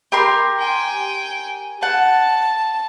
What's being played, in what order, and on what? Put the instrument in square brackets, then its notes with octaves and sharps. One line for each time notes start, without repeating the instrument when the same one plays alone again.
[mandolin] G4 A#4 C6
[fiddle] G5 G#5
[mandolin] F#5 [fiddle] A5